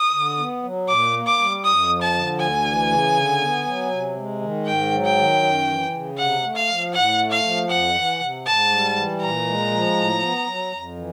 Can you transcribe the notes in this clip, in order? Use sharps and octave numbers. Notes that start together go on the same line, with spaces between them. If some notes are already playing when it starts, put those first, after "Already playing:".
Already playing: D#6
D3
B3
F#3
A#2 D6
A#3
D6
G3
F2 D#6
F3
A5
D3
D2 G#5
E3
C#3
D3
B3
F#3
C3
G#3
D#3
G#2 G5
F#3
G5
D#3
F#2
E3
C#3
C3 F#5
A3
F5
F3
A2 F#5
A3
F5
F3
F2 F#5
E3
C3
G#2 A5
G3
E3
A#2 A#5
G#3
F3
A2
B3
F#3
F2
E3